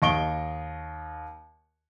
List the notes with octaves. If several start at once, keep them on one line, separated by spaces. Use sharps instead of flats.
D#2 D#5 C#6 D7 G7